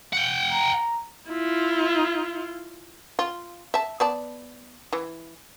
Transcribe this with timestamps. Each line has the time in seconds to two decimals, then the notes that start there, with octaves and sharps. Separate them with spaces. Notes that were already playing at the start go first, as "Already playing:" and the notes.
0.13 F#5 G5
0.52 A#5
1.30 E4 F4
3.19 F4
3.74 E5 A5
4.00 B3 D5 A5
4.93 E3